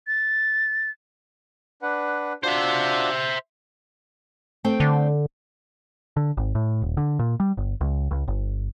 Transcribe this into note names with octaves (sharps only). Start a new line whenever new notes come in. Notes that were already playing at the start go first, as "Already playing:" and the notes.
A6
D4 B4 F#5
D4 F4 F#4 C5 E5
A3 C4 G5
D3
D3
G#1
A2
D#1
D3
A#2
G3
G1
C#2
C#2
G1